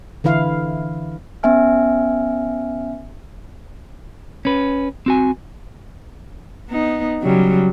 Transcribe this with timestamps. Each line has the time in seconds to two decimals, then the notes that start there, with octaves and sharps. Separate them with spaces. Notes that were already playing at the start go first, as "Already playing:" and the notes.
0.24 D3 E3 E4 F5
1.43 B3 C#4 E5 G#5 F6
4.45 C#4 B4
5.06 C4 F#4 G#5
6.69 B3 D#4
7.22 C#3 F#3 G3